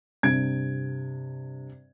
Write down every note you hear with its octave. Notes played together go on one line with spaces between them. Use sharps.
G2 C3 G#6 D7